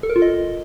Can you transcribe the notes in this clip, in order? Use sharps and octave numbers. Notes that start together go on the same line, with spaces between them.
A4
A#4
F4
D#5